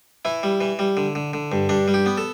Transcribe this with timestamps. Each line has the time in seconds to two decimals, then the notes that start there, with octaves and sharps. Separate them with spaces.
0.25 E3 E4
0.43 G3
0.61 E3
0.79 G3
0.97 D3
1.15 D3
1.33 D3
1.52 G2
1.69 G2 D4
1.88 G3
1.94 G4
2.06 B3
2.17 A4